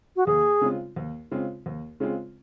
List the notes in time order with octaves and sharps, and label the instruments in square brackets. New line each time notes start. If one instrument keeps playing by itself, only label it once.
[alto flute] F#4
[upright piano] D#2 [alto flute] G#4
[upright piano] C#3 G#3 C4 F4
D#2
C#3 G#3 C4 F4
D#2
C#3 G#3 C4 F4